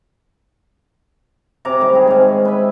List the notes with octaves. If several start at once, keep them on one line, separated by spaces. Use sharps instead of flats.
C3 C#4 A#5 D6
D#3 G3 A3
G#4
G#2 C#4
B4 E5